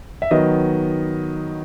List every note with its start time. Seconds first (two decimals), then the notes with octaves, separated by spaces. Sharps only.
0.22 E5
0.31 D#3 F#3 B3 D#5